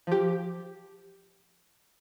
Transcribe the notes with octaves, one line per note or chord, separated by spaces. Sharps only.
F3 G4